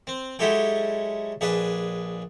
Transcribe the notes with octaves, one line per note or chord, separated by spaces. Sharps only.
C4
F#3 G#3 E4 G4 A4 G5
A#1 D4 G#4 B4